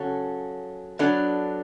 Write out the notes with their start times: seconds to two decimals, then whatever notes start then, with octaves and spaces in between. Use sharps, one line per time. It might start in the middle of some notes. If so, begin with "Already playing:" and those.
Already playing: C#3 F#3 C#4 F#4 A4
0.99 F#3 B3 D4 A4